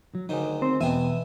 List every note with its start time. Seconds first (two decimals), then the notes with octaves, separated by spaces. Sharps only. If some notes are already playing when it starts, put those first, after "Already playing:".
0.15 F#3
0.29 D2 D#3 F#3 D#4 G#4
0.62 C4
0.81 E2 B2 G#3 B3 E5 G5 G#5